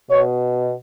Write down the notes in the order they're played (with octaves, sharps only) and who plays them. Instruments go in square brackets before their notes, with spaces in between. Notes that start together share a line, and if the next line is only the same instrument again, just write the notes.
[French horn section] B2 C#5